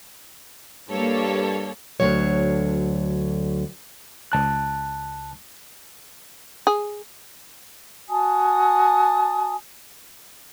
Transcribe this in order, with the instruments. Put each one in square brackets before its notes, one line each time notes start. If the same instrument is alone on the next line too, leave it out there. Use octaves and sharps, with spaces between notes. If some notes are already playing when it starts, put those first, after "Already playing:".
[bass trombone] G2 [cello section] G3 A#3 [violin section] A4 C#5
[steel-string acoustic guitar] D2 B2 D3 F#3 C#5
[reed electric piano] C#2 A5 F#6
[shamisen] G#4
[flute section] F#4 G#5 A5 D#6